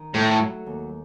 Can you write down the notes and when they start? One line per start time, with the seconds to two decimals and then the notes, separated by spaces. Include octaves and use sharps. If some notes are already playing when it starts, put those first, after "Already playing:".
Already playing: D#3
0.14 A2 A3
0.40 F#3
0.66 D#2